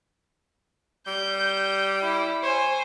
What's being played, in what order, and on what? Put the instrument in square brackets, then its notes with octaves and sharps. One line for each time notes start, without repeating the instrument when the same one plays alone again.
[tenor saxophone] G3 [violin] G6
[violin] E4
[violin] C5 G#5 [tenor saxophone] C#5